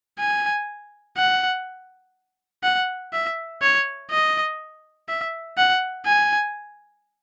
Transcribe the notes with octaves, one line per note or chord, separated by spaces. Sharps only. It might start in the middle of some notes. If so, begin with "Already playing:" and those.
G#5
F#5
F#5
E5
C#5
D#5
E5
F#5
G#5